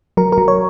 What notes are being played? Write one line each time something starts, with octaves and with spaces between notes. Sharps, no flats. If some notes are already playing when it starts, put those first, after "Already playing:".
F#3 A#4
A#4
F#3
C#5